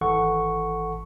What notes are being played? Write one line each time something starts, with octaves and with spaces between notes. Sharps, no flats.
G#1 E3 A4 F#5 C#6